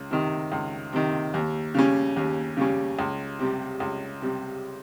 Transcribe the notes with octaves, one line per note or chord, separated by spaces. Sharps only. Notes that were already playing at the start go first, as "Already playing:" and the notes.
Already playing: C#2
C3 D#3
C#2
C3 D#3
D#2
C#3 G3 C#4
D#2
C#3 G3 C#4
C#2
C3 G3
C#2
C3 G3